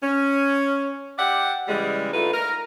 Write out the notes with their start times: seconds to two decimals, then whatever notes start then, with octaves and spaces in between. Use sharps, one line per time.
0.02 C#4
1.18 G4 D5 E5 F#5
1.68 C#3 E3 G3 G#3
2.13 D3 A3 D#4 F4 B4
2.32 A#4